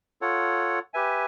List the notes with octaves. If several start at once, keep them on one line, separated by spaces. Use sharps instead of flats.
F4 A4 C#5 F#5
G4 B4 E5 G#5